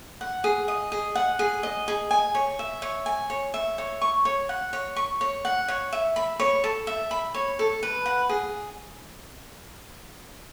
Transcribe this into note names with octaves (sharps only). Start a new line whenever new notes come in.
F#5
G#4
D#5
G#4
F#5
G#4
D#5
G#4
G#5
C#5
E5
C#5
G#5
C#5
E5
C#5
C#6
C#5
F#5
C#5
C#6
C#5
F#5
C#5
E5
B5
C#5
A4
E5
B5
C#5
A4
B4
F#5
G#4